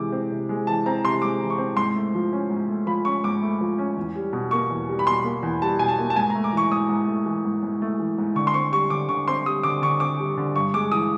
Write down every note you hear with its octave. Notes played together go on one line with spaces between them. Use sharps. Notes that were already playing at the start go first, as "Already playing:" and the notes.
Already playing: C3 E3 G#3 D6
C4
C3
G#3
E3 A5
C4 A#5
C3 C6
G#3 D6
E3
C#6
C4
G#2 C6
A3
F3
C#4
G#2
A3
F3 B5
C#4 C#6
G#2 D6
A3
F3
C#4
E2
G3
B2
A#3 C#6
E2
G3
B5
B2 C6
A#3
E2
G3 A5
B2 G#5
A5
A#3
A5
G#2 G#5
A#5
A3
D6
E3 C#6
G#2 D#6
G#2
A3
E3
G#2
G#2
A3
E3
G#2
D3 C#6
C6
C4 C#6
G3 C#6
D3 D6
D3 C#6
C4 C6
G3 D#6
D3 D6
D3 C#6
C4 D6
G3
D3
G2 C#6
G#3 D6
E3 D#6